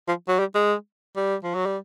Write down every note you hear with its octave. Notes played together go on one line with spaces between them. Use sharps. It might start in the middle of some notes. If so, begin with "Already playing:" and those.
F3
F#3
G3
G#3
G3
F3
F#3
G3